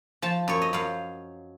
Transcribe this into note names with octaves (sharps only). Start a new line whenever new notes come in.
F3 A5
F#2 C#5
D#5
F#2 F5